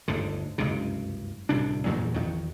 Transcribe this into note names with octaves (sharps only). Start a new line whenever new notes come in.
G1 D2 G#2 D3
F#1 C#2 G2 C3
D1 C2 C3 D4
E2 G2 A#2 F#3
G#1 E2 D#3 F#3